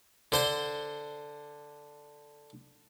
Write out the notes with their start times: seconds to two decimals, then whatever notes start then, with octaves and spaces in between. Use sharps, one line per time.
0.32 D3 C5 C6